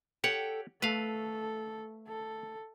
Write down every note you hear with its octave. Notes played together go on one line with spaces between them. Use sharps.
G4 A4 C#5 F#5 G5
A3 A4 B4 F5
A4